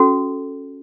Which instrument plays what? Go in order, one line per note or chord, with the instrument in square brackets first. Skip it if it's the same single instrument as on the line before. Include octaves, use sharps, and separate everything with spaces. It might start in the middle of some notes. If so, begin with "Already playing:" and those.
Already playing: [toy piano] C#4 F#4 A4